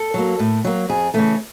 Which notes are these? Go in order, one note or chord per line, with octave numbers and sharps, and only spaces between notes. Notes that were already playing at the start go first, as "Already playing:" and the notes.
Already playing: A4
F#3 A#3
A2
F#3 A#3
F2 G#4
C#3 E3 A3 A4